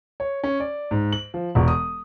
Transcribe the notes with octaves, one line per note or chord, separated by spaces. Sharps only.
C#5
C#4
D5
G#2
F#7
F3
E1
D#6